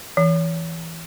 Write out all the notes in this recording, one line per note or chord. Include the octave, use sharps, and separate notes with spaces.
E3